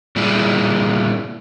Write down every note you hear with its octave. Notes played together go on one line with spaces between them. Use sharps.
A#2 G3 E4 G#4